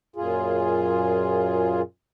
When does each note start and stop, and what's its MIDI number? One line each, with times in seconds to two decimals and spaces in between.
0.16 1.82 42
0.16 1.82 46
0.16 1.82 65
0.16 1.82 68